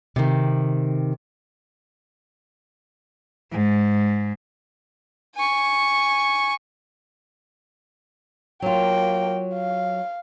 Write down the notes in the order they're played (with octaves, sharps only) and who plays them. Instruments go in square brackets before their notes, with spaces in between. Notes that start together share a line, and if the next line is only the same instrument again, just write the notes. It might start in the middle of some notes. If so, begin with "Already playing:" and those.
[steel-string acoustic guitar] C3 D#3
[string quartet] G#2
[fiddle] G#5 C#6
[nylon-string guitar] F#3 F4 [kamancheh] A#3 G5
[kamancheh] F5